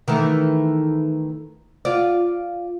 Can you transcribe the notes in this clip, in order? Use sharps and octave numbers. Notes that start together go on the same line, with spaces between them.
D#3 E3 A3
F4 D5